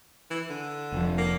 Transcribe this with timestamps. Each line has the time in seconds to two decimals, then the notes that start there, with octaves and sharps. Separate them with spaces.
0.31 E3
0.49 D3
0.92 F1 F3
1.18 A#3